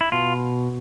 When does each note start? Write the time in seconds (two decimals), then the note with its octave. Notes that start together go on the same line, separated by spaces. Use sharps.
0.01 E4
0.12 B2 F4